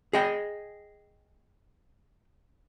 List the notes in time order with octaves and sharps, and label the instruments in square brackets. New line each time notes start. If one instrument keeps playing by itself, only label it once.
[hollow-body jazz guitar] G#4 D#5 G5